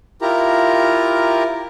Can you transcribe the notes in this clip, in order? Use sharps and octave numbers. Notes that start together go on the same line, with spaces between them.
E4 F4 G4 A#4 A#5